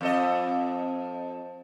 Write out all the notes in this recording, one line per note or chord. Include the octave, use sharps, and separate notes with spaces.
F2 A4 D#5